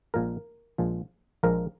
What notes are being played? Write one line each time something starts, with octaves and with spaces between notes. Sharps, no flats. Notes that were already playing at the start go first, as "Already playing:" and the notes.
A#1 A#2 F3 G#3 A#4
A#1 A#2 F3 G#3
A#1 A#2 F3 G#3 A#4